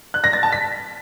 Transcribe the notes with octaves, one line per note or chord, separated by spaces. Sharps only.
F#6
A#6
A6
A5
B6